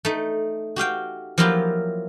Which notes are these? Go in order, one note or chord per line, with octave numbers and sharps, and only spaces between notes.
A3 D#4
F#4 G4 F5 G5
F3 F#3 A#3 E4 F4 G4